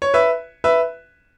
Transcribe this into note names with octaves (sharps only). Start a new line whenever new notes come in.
C#5
B4 E5
B4 E5